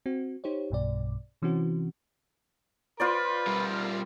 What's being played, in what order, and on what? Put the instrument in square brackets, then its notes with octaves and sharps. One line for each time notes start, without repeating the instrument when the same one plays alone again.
[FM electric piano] C4 F#4
D#4 G4 C5 C#5
B1 G2 B2 D5
C3 E3 C4 C#4 F#4
[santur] F4 C5 D5 [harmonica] B4
[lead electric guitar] G3 A#4